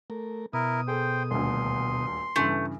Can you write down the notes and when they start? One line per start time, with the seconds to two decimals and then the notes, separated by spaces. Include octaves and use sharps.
0.10 A3 A#4
0.53 B2 E4 A#4 D#6
0.88 G#4 A4 C5 G5
1.31 D#1 D2 C6
2.36 G2 C#3 E3 A3